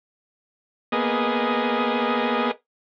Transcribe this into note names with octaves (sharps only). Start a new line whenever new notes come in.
A#3 B3 G#4 D#5